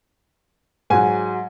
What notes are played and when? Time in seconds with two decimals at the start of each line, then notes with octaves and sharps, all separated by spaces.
0.90 G#2 F#3 G#5